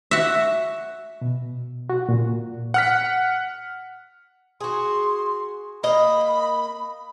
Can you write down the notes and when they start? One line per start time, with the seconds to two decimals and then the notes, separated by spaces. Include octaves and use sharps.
0.11 F#4 E5
1.21 B2
1.90 F#4
2.09 A#2
2.74 F#5 F6 B6
4.61 F#4 G#4 C6
5.83 A#3 D#5 B5